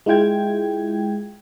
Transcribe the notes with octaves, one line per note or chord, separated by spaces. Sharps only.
G#3 E4 F4 G5 G#6